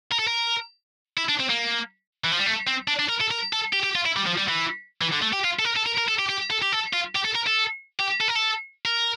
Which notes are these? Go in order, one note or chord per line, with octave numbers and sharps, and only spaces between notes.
A#4
A4
A#4
E4
D4
C4
A#3
E3
F3
G3
A3
C4
D4
D4
A#4
A4
A#4
A4
G4
G4
F4
E4
G3
F3
G3
E3
E3
D3
A3
G4
F4
A4
A#4
A4
A#4
A#4
A4
G4
G4
A4
G4
A4
F4
G4
A4
A#4
A4
G4
A4
A#4
A4
A#4